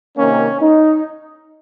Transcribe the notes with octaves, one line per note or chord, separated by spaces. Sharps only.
C3 D#3 A#3 C#4
D#4